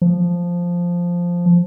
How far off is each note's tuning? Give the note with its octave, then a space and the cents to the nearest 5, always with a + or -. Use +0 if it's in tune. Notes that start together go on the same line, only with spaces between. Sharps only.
F3 +0